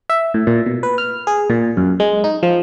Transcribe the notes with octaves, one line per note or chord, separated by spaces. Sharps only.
E5
A2
A#2
B2
B4
F6
G#4
A#2
F#2
G#3
D#4
F3